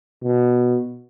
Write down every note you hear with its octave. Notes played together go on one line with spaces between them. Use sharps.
B2